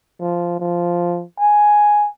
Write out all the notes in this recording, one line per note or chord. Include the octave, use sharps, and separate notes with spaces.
F3
F3
G#5